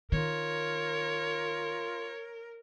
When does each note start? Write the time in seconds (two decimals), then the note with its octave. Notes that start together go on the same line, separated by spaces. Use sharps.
0.12 D#3 F4 A#4 C#5